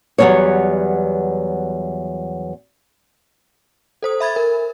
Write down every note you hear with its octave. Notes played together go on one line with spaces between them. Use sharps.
E2 F#3 G3 B3 C#5
A4 C5 D#6
E5 B5 G#6 A6
A#4